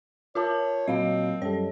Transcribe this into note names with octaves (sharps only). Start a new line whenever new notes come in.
F4 A#4 C#5 A5
A#2 F#3 C4 D#5 F5
F#2 G3 A4 C#5